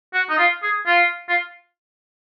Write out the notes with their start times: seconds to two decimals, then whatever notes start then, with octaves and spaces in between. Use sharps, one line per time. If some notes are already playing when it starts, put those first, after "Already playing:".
0.13 F#4
0.30 D#4
0.38 F4
0.62 G#4
0.87 F4
1.29 F4